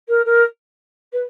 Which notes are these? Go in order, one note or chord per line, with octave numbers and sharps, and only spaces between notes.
A#4
A#4
B4